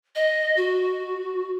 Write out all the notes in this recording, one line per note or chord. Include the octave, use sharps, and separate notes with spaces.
D#5
F#4